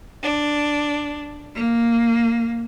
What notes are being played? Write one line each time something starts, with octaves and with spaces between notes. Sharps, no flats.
D4
A#3